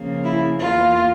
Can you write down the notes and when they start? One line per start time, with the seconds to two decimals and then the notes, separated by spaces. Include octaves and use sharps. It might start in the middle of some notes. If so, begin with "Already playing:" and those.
Already playing: C#3 F3 A#3
0.24 E4
0.58 E2 E3 A#3 F4